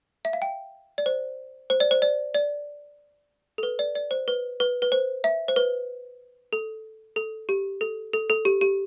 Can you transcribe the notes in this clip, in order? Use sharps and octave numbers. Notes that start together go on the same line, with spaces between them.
E5
F5
G5
D5
C5
C5
D5
C5
D5
D5
A4
B4
D5
D5
C5
B4
B4
B4
C5
E5
C5
B4
A4
A4
G4
A4
A4
A4
G4
G4